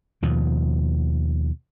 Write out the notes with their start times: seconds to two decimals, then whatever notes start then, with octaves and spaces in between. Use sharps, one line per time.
0.22 D#2 B2 F3